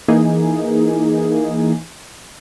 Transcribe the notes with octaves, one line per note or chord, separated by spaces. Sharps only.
E3 A#3 D#4 G#4